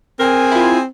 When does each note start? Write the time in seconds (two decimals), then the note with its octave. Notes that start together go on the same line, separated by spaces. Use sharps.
0.19 C4 G#4 A#4 G#5
0.52 E4 F4